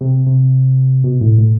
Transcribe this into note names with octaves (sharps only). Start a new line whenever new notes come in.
C3
C3
B2
A2
A2